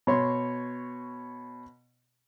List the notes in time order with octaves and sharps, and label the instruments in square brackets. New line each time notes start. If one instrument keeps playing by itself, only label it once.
[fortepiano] B2 C#5 C6